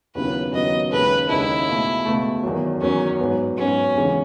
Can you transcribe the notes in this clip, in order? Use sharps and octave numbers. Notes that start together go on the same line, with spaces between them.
D#2 C#3 F#3 B3 E4 B4
D#2 C#3 F#3 B3 E4 D#5
D#2 C#3 G#3 D#4 A4 B4
D#2 C#3 G#3 D#4 E4 A4
C#2 B2 A3
C#2 B2 A3
E2 D#3 F#3
E2 D#3 F#3 C#4
G#2 F#3 B3
G#2 F#3 B3 C#4
D#2 C#3 E3 G#3 B3